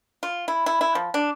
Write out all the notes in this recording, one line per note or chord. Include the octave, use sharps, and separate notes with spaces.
F4
E4
E4
E4
F3
D4